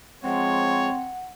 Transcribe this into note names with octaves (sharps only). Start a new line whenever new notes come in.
F3 G#3 C4 C#5 F#5